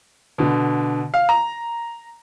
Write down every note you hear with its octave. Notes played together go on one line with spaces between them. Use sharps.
B2 D3
F5
A#5